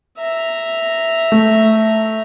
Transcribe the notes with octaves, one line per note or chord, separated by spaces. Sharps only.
E5 A#5
A3